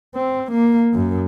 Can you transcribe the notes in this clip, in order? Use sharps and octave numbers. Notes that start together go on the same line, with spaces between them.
C4
A#3
F#2